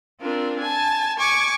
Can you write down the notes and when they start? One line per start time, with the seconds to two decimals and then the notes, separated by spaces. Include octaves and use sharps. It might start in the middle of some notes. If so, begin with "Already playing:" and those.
0.21 C4 D4 F4 A#4
0.60 G#5 A5
1.18 G#5 C#6 D6